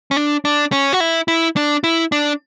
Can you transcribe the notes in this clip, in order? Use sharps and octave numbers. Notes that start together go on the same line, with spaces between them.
C#4
D4
D4
C#4
F#4
E4
E4
D4
E4
D4